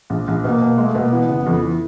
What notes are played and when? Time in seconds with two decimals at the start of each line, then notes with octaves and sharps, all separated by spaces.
0.10 A#1
0.28 A#1
0.44 B2 A#3
0.61 B2
0.78 G#3
0.86 A3
0.95 B2 A#3
1.12 E3 B3
1.29 F#1
1.46 F2
1.62 E3